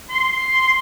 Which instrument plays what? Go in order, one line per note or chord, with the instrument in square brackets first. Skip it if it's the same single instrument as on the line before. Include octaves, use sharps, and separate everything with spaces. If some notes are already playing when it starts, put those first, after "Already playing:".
[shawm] C6